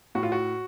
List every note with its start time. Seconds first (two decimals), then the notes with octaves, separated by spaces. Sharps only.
0.15 A2 F#4
0.23 F4
0.32 F#4